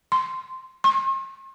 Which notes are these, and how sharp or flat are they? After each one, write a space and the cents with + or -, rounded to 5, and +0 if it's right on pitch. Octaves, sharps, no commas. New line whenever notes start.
C6 -5
C6 +45